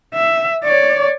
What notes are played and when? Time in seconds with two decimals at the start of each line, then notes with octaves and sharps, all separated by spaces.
0.15 E5
0.64 C#5 D5